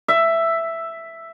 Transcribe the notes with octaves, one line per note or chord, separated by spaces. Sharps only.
E5